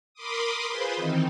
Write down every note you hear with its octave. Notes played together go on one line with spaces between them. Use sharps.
A#4 B5 C6 D6 D#6
F4 G#4 B4 C5 B5 C6
D#3 E3 C4 D#4